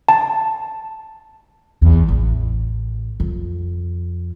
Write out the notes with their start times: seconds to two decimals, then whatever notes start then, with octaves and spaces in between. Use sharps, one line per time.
0.09 A5
1.82 E2
2.08 A1
3.20 F2